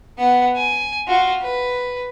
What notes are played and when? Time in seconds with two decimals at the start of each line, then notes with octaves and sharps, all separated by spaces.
0.19 B3 F#5
0.56 G#5
1.08 F4 F#4
1.42 B4